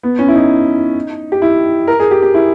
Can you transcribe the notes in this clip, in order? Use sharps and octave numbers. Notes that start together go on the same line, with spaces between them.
B3
C#4
E4
D#4
G4
E4
A#4
G#4
G4
G4
E4